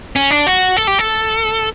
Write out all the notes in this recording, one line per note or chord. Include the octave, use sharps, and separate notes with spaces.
C#4
D4
F#4
A4
G4
A4